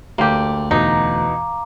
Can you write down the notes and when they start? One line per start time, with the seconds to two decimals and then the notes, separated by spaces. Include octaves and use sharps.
0.18 D2 A#3 G4
0.71 E2 B2 D#4 F5 A#5 D6